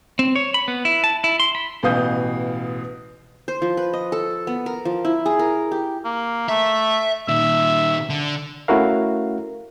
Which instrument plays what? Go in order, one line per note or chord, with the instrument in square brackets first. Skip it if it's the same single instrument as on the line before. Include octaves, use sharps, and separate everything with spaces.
[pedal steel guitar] C4
C#5
B5
B3
E4
A5
E4
C6
B5
[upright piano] A1 B2 E3 F5 D#6 G6
[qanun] C5
F3
B4
D#5
A4
B3
A#4
F3
E4
G#4
A#4
G4
[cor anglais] A#3
[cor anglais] A3 [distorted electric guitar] E5
[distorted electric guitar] A#2 D#3 [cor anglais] E5
[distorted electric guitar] D3
[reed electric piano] A3 C#4 E4 F#4 A#4 F5